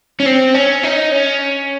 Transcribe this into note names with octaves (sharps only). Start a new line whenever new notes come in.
C#4
C4
C#4
D#4
C#4